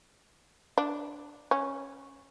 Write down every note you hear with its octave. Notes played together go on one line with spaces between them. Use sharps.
D4
C#4